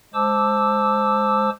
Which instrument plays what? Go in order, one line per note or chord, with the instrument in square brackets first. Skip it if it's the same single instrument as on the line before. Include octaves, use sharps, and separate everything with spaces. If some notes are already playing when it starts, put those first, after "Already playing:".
[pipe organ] G#3 C5 A5 D6 E6